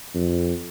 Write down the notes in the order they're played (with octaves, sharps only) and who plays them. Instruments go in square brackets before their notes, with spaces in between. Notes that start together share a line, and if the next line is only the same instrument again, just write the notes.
[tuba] F2